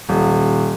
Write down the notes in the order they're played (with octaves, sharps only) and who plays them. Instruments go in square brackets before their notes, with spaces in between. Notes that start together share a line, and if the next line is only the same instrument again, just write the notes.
[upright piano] D#1